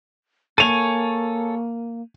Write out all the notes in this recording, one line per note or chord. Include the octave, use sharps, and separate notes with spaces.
A#3 A4 C#5 G#5 D#7 F7